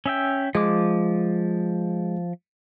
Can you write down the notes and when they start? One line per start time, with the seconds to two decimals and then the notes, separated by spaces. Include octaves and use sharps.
0.06 C#4 E5 G5
0.55 F3 G#3 D6